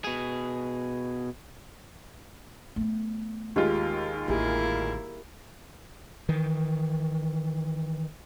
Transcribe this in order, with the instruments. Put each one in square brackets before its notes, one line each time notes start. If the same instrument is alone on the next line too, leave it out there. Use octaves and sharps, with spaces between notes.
[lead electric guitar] B2 G#4
[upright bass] A3 B3
[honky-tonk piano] D#2 G#3 F4 [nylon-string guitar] D#4 G4
[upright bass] A1 D3 [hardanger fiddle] A#3 E4 [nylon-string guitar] G4 G#4
[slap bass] D#3 E3